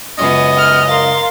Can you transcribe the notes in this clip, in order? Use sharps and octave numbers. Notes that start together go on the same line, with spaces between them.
C#2 F#2 B3 C#4 D#5 G#5
F6
A#4 F5 C6 A6